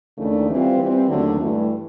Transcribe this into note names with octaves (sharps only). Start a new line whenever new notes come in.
D#2 C#3 E3 A3 D4
E3 G3 C4 F4
E3 G3 C4
D#2 D3 F#3 A3 D4
G2 E3 A3